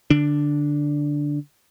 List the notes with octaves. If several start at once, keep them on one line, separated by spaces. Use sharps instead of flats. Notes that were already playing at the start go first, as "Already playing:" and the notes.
D3 D4